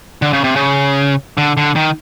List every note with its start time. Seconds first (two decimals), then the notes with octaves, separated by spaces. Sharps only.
0.22 D3
0.33 C#3
0.44 C3
0.56 C#3
1.38 D3
1.57 D3
1.76 D#3